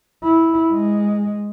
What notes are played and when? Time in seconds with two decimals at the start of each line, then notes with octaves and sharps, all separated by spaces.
0.24 E4
0.72 G#3